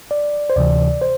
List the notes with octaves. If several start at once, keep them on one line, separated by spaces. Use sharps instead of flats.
D5
C5
D2 C3 E3 D5
C5